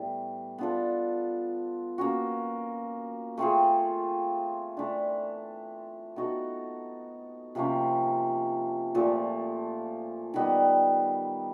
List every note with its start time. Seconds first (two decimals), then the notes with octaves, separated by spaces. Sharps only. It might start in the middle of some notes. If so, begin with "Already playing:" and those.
Already playing: A2 E3 G3 B3
0.58 B3 D4 F4 A4
1.98 A#3 C#4 F#4
3.37 A3 C4 F4 G#4
4.77 E3 A3 D4
6.16 B3 D#4 F#4 A4
7.55 C3 F3 A#3 C#4
8.95 A#2 F3 A3
10.34 D#3 G3 B3